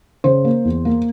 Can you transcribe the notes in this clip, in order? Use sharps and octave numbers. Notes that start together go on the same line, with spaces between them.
C#3 C5
A#3
E2
A#3